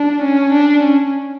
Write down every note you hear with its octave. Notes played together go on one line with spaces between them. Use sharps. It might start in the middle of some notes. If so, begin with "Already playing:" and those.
Already playing: D4
C#4
D4
C#4